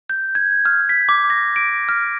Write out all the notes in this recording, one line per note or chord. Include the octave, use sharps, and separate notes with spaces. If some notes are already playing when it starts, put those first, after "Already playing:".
G6
G#6
F6
B6
D6
A#6
D7
F6